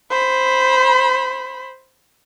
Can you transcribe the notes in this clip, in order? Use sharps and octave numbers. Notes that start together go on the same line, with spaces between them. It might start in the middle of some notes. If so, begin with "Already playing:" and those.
C5 B5